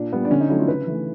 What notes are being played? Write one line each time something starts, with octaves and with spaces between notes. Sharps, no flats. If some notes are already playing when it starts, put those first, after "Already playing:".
Already playing: A#2 D4
G3 B3
D4
D3 C#4
D#4
F#3 A3 E4
F4
C#3 B4
E3 A3